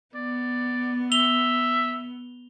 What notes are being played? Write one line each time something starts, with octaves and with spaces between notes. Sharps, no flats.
B3 D5
E5 F7 G7